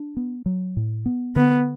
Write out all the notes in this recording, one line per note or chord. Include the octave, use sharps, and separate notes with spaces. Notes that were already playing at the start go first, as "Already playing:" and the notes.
Already playing: D4
B3
F#3
A2
B3
D3 B3